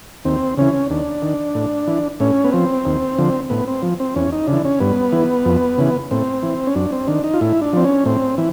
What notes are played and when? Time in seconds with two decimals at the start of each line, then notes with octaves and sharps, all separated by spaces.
0.25 D#2 C4
0.57 C#3 E3 C#4
0.90 D#2 D4
1.22 D#3
1.55 A2
1.87 E3
2.20 A2 C#4
2.44 B3
2.52 F3 C4
2.85 D#2
3.18 D3 F3
3.50 A2 B3
3.67 C4
3.83 F3
4.00 C4
4.16 E2 C#4
4.32 D#4
4.47 C#3 E3 D4
4.65 C#4
4.80 G2 B3
5.12 E3
5.45 F2
5.78 C#3 E3
6.11 A2 C4
6.43 E3
6.67 C#4
6.75 F#2 D4
6.92 C4
7.07 D#3 D4
7.24 D#4
7.33 F4
7.41 A2 E4
7.62 D4
7.73 F3 C4
7.84 C#4
8.06 A2 C4
8.38 E3